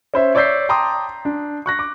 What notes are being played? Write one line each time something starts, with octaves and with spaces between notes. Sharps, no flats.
C#4 C5 E5
C#5 D5 E6 G6 B6 C7
G5 A5 A#5 C6 D6 D#6
D4
C#6 F#6 A#6
D6